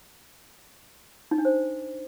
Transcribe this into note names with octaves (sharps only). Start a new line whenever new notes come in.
D#4
D4
C5